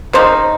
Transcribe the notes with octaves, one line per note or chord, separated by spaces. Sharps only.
C#3 F3 A#3 D#4 C5